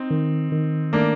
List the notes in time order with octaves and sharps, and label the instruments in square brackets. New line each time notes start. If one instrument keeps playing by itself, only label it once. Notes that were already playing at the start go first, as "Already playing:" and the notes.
Already playing: [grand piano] C4 D#4
[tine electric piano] D#3
D#3
[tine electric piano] A3 [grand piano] A#3 D4